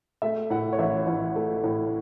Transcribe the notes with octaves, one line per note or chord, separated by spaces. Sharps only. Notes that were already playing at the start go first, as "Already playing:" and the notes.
A3 E5
A2 F#5
C#5
A1 E5
A1
A3
A2